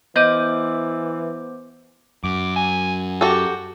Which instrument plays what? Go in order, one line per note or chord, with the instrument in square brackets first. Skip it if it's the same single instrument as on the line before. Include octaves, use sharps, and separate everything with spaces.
[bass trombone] E3 [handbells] B3 C5 D6 [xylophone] D#5 G6 D#7
[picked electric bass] F#2 [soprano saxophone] D6
[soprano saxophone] G#5
[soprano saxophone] F#4 [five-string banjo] G4 A4